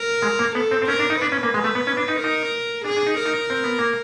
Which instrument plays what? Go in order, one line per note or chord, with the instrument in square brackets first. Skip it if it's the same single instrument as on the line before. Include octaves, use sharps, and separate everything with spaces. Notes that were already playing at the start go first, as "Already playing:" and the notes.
Already playing: [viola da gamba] A#4
[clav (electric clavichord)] G#3
A#3
[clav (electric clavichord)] B3 [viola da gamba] A4
[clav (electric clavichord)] C4
C4
[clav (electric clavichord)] C#4 [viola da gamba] A#4
[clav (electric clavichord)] D4
D#4
[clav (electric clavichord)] D4 [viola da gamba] B4
[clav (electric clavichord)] C#4
A#3
G#3
A3
B3
C#4
D4
D#4
[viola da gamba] A#4
[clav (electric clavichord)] D#4
[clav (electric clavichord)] D4 [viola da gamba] G#4
[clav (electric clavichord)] D4
D#4
[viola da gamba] A#4
[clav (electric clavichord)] D#4
C4
B3
A#3